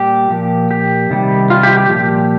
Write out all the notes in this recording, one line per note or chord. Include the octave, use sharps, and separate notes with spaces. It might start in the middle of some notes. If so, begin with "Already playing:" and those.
Already playing: A#2 G3 G4
A#2 F3
G4
C3 D#3 G3
F4
G4
G4
A#2 F3